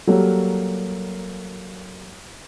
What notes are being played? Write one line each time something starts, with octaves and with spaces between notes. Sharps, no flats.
F#3 G3 A#3 F#4 A4 A#4